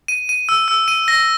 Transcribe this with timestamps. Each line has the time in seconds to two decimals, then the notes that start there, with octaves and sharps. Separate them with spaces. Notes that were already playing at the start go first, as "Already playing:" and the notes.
0.08 D#7
0.29 D#7
0.49 E6
0.68 E6
0.88 D#7
1.08 A#6